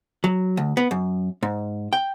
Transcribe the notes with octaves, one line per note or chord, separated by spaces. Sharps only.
F#3
D2
B3
F#2
G#2
G5